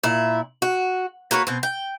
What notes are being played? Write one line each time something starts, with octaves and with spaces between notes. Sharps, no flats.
A#2 E4
F#4
A#3 F#4 B4 C#5
B2 C4
G5